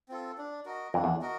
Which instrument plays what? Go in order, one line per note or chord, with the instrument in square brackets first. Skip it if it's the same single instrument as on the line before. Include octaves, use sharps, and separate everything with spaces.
[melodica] C4 F4 A4
D4
F#4 A#4 D#5
[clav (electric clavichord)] F2 [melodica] D4
[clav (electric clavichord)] E2
[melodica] F#4 A#4 D#5